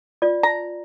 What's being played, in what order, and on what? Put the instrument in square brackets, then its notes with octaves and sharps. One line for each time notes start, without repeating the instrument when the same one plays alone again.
[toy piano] F4 D5
[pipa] A#5